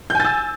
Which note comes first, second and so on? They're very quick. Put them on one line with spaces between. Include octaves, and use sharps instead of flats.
G6 G#5 A6 E6